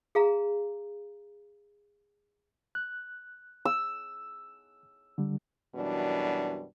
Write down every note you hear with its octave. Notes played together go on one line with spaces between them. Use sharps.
G#4 F5 A#5
F#6
E6
D3 G3
F#2 B2 E3 G3 D4